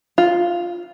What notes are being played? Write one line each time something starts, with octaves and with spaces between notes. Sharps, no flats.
F4